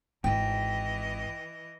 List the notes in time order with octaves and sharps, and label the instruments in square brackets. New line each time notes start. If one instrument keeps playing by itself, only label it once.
[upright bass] G#1 E4 [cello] E3 D#5 [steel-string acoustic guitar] G5